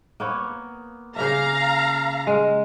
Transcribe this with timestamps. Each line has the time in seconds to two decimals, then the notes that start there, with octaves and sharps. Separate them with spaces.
0.20 A#3 B3 C#5
1.16 C#3 A#3 E5 F5 A#5
2.27 G#3